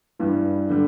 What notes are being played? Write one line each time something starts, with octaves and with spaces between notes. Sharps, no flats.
G2 E3 G3
D3 G3